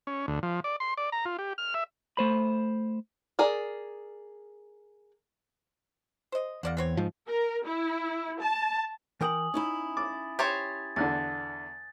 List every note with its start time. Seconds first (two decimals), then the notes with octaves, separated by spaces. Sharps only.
0.07 C#4
0.28 D2
0.43 F3
0.64 D5
0.80 C6
0.98 D5
1.12 A#5
1.25 F4
1.39 G4
1.58 F6
1.74 E5
2.17 A3 C5 B5
3.39 G#4 A#4 D5
6.32 C5 D#5
6.63 E2 A#3 D5 F#5
6.77 B3 C4 C#5
6.97 G#2 F3
7.27 A#4
7.66 E4
8.41 A5
9.21 E3 A#4 G5 G#5 D#6 F#7
9.54 C#4 D#4 E4
9.97 D6 A6
10.39 G4 C5 C#5 G#6 A6
10.96 E2 D3 F#6 A6